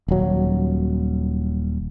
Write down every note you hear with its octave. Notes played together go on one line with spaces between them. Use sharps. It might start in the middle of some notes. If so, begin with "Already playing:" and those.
D#1 F#3